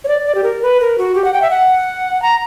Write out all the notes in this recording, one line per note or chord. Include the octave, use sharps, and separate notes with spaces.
C#5
D5
D5
G4
A#4
B4
A#4
F#4
G4
F#5
G5
E5
F#5
A#5